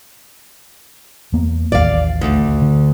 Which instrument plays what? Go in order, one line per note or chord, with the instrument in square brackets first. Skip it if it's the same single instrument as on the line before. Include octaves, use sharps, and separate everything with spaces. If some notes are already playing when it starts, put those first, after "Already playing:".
[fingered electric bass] E2 A#3 B3
[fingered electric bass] A1 D#2 [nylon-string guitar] D5 F5
[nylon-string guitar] D2
[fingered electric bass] D3